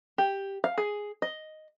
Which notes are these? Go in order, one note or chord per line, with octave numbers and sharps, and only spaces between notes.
G4
F5
G#4
D#5